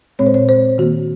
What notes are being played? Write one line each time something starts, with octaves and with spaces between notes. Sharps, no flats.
A#2 G#3 C4 C#5
C5
C#5
C5
D#3 A#3 F#4